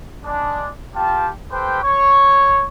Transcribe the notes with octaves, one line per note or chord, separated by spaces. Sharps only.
G#3 D4
F4 G4 G5 A5
G4 A4 B4 C5 G5
C#5 C#6